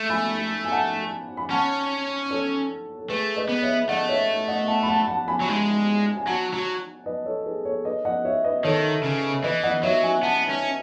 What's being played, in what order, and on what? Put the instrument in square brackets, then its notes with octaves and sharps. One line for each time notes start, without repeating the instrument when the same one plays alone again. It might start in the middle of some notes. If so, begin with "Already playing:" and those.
Already playing: [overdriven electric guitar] A3
[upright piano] G#5 B5
G#5
F#5 A5
B5
[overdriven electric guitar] C#4 [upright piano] F#5 A5
[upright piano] A4 C#5
A4
[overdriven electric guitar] A3 [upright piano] G#4 B4
[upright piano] B4 D#5
[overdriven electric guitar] B3
[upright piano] C#5 E5
[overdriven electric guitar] A3 [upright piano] D#5 F#5
[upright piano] C#5 E5
D#5 F#5
F#5 A5
B5
F#5 A5
F#5 A5
G#5 B5
[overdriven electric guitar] F#3
G#3
[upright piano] G#5
[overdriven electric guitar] F#3 [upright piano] F#5 A5
[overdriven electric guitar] F#3
[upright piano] B4 D#5
A4 C#5
G#4 B4
A4 C#5
B4 D#5
D#5 F#5
C#5 E5
B4 D#5
[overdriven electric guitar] D#3 [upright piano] A4 C#5
[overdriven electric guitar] C#3
[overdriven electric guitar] E3 [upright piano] B4 D#5
[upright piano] D#5 F#5
[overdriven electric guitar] F#3 [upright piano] C#5 E5
[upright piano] E5 G#5
[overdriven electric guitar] B3 [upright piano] F#5 A5
[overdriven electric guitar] C#4